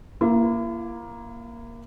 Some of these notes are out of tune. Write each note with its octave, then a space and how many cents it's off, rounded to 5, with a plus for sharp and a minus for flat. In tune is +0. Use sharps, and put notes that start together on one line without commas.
A#3 +10 E4 +40